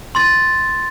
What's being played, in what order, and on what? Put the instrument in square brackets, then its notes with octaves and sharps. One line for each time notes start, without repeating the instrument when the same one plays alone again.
[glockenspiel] C6 A6